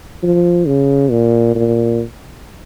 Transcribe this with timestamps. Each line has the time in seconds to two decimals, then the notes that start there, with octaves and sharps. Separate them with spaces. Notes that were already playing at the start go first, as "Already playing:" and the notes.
0.23 F3
0.67 C#3
1.11 A#2
1.56 A#2